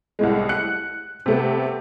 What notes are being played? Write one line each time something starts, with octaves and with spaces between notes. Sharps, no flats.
C2 A2 G#3
F#6 C#7
C3 A3 B3